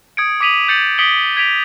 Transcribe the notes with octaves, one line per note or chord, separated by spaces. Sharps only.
D#6 G#6 C#7 D7
D6 D#6 B6 D#7 F7 F#7
G6 A6 C#7 F#7
D#6 B6 C#7 D7 F#7 G7
G#6 B6 D7 F7